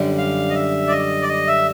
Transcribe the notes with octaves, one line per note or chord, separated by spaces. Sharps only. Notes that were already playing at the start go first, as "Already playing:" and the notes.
Already playing: F#2 D3 G3
F5
D#5
E5
D5
D#5
D5
D#5
E5